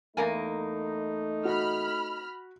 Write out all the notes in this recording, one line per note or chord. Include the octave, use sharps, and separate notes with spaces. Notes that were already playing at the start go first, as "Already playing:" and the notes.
E2 A3 A#3 D#4 G#5
F#4 B5 F6